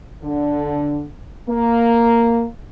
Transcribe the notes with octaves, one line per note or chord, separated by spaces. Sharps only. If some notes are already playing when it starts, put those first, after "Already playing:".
D3
A#3